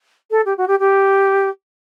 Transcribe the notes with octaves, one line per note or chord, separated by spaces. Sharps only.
A4
G4
F#4
G4
G4